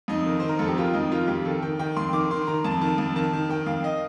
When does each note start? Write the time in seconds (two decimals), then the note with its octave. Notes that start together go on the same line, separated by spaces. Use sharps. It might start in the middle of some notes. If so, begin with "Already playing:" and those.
0.08 F2 D#4
0.26 D#3
0.40 D#3 C5
0.49 A#4
0.59 F2 A4
0.68 G4
0.77 D#3 F4
0.93 F2 D#4
1.12 D#3 F4
1.28 F2 G4
1.45 D#3 A4
1.62 D#3 G5
1.79 D#3 G5
1.97 F2 C6
2.13 D#3 D6
2.31 D#3 C6
2.47 D#3 A#5
2.64 F2 A5
2.81 D#3 A5
2.98 F2
3.16 D#3 A5
3.33 D#3
3.49 D#3 G5
3.66 F2 F5
3.84 D#5